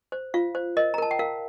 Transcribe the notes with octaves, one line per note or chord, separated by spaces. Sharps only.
C5
F4 F5
C5
A#4 D#5
A#5
A#4 A5
G5
A#4 F5